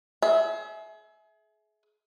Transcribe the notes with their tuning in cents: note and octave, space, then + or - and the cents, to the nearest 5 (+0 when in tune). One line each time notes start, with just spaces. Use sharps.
G#4 +35 E5 -15